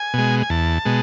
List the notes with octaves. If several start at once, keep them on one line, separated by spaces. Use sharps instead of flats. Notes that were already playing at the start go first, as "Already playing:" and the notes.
Already playing: G#5
B2 G#3
G#5
E2 A5
B2 G#3